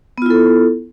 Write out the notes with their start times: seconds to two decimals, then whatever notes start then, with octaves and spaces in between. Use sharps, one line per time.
0.18 B3
0.22 F4
0.26 E4
0.30 A4